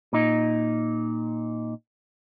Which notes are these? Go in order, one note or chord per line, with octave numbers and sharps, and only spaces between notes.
A#2 D#4